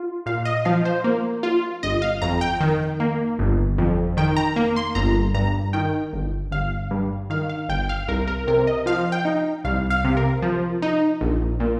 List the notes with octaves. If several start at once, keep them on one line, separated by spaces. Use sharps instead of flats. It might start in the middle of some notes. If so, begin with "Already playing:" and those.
Already playing: F4
A#2 F5
D#5
F3 F5
C5
A#3
F4
G1 D#5
F5
F2 A#5
G5
D#3
A#3
G1
F2
D#3 G5
A#5
A#3
C6
G1 A#5
G2 A#5
D#3 G5
G1
G1 F5
G2
D#3 F5
F5
G1 G5
F5
C2 A#4
A#4
C3 A#4
D#5
F3 F5
G5
D#4
C2 F5
F5
C3
A#4
F3
D#4
A#1
A#2